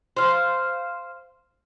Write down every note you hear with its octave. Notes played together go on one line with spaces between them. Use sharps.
C5 F5